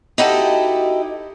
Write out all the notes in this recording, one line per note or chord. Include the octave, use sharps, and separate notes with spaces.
D#4 E4 F#4 G4 A4 D#5